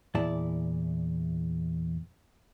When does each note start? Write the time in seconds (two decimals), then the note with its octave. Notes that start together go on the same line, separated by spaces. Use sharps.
0.15 E2 A#2 E4 D5 A5